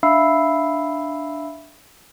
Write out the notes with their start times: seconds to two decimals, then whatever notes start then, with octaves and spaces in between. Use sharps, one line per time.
0.03 D4 E5 F5 B5 E6 C7